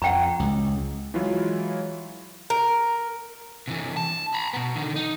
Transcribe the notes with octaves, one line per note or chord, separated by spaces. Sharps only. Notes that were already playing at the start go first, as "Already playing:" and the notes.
F2 F#5 G5 A#5
C#2
E3 F#3 G#3 E4 F4 C#5
A#4
C3 E3
A5
A#5 B5
B2 B3
D3 D#3
D#4